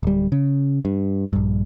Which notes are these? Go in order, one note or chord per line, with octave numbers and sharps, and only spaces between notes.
D1 G3
C#3
G2
A#1 G2